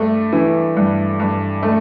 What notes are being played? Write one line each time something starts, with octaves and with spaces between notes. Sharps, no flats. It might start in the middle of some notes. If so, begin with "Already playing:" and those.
Already playing: G2 A3
E3
G2
G2
A3